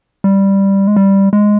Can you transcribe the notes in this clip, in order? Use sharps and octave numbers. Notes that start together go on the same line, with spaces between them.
G3
G#3
G3
G#3